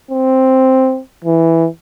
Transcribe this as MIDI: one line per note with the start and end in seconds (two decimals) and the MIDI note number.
0.11 1.00 60
1.25 1.67 52